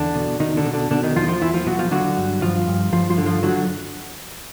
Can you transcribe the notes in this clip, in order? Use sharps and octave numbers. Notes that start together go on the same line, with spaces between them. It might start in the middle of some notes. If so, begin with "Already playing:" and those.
Already playing: E2 D3 D4
B2
B2 D#3 D#4
D3 D4
B2
D3 D4
B2 D3 D4
D#3 D#4
E2 F3 F4
F3 F4
E2 E3 E4
F3 F4
B2 F#3 F#4
F3 F4
D3 F#3 F#4
G2
G2 F3 F4
G2
G2 F3 F4
F3 F4
D3
F3 F4
D3 F#3 F#4